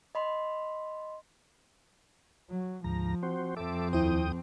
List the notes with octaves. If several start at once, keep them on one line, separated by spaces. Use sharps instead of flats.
D#5 B5 C6
F#3
D2 G#2 F3 A#5
C4 F#4 C5
F2 C4 A4 E5 D6
D#2 E4 C5 G5 D#6